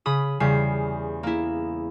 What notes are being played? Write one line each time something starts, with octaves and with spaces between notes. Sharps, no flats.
C#3 B5 D#6
E2 C#3 G3 C7
A#3 E4